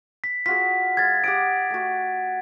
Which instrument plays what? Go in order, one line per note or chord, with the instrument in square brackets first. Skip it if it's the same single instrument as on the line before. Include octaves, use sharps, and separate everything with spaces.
[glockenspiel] B6
[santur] F4 F#4 G#4 [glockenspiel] B6
[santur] G#3 F5 [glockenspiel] G#6 A6
[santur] G4 F#5 D#6 [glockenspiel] D7
[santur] A3 F#4